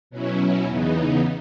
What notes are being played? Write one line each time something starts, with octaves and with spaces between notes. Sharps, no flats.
B2 F#3 C#4 E4
E2 C#3 E3 B3 D#4